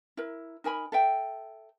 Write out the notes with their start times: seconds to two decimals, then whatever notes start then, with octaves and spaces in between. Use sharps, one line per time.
0.17 E4 A#4
0.64 D#4 A#4 G#5 B5
0.92 A4 E5 G5